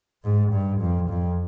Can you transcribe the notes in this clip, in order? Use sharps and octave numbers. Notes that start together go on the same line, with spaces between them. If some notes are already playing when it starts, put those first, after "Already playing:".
G#2
G2
F2
F2